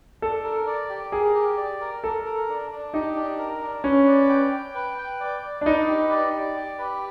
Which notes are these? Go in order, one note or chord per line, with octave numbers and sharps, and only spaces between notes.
D4 A4
A#4
D5
G4
G#4 A#4
G4
D5
A#4
A4 A#4
A#4
D4
D4
D#4 G4
D4
A#4
D4
C#4 B4
D5
G5
G5
B4
G5
D5
D5
D4
D#4 B4
G4
D5
D5
G4
B4